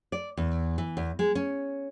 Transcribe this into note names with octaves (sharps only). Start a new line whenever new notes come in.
D5
E2
E3
E2
G#3
C#4